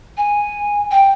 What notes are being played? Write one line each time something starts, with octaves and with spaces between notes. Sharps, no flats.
G#5
G5